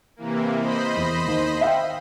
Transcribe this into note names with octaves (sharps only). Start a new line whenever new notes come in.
C3 E3 A#3
C5 D#5 B5
E2
D#2
E5 F5 G5